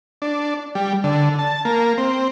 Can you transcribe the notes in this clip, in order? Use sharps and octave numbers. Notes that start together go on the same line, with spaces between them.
D4
G3
D3
A5
A#3
C4